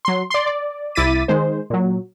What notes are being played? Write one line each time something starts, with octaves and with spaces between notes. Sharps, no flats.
F#3 C6
D5 C6
D5
C2 E4 D6 A6 B6 D#7
D#3 G#3 C5
A#2 F#3